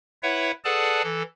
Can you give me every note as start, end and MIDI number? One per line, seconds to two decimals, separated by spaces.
0.23 0.51 64
0.23 0.51 71
0.23 0.51 73
0.23 0.51 76
0.23 0.51 78
0.65 1.02 68
0.65 1.02 69
0.65 1.02 71
0.65 1.02 74
0.65 1.02 78
0.65 1.02 81
1.04 1.23 52
1.04 1.23 69